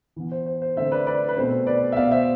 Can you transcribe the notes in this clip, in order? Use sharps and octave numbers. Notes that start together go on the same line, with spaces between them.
E3 B3
C5
C5
C5
D3 A3 C4 C5 E5
B4 D5
B4 D5
B4
B2 A3 C4 C5
B4 D5
E5
B2 B3 D5 F5
C5 E5